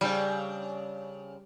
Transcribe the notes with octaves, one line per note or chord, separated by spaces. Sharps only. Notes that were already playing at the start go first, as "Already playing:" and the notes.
C#3 G3 C4 D4